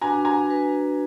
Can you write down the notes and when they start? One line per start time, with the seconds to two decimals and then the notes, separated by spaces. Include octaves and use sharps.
0.01 D4 F#4 B4 G#5 A#5
0.25 G#5 A#5
0.49 D4 F#4 B4